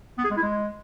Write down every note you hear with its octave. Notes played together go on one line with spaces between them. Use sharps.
B3
G#4
G#3
E4
G#3